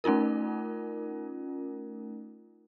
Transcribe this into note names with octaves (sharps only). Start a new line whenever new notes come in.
A3 C#4 D#4 F4 A#4